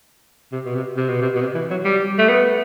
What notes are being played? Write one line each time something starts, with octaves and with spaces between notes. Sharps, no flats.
C3
B2
C3
C3
B2
C3
B2
C3
E3
F#3
G3
A3
B3